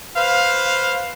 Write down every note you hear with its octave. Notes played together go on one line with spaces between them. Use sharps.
B4 C5 F5